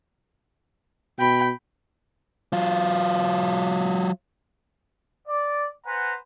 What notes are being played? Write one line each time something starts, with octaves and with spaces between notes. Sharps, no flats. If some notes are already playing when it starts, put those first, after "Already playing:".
B2 G5 B5
F#3 F4
D5
B4 C5 F#5 G#5 A#5